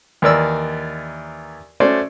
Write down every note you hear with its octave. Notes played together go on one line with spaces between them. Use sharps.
D#2 E3 A#4 D5 E6
A3 C#4 F#4 C5 D5